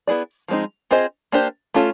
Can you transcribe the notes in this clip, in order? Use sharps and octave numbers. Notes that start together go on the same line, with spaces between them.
B3 E4 G#4 B4 D5
F3 G#3 C4 D#4
C4 F4 G#4 C5 D#5
A#3 D4 G4 C5
A3 C#4 F4 A4